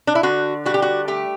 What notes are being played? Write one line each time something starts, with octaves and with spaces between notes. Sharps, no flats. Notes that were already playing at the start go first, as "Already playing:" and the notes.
D4
E4
D3 F#4
G3 F#4
G4
F#4
A3 G4